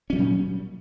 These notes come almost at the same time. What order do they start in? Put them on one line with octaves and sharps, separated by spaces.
C#4 F#3 G3 A#2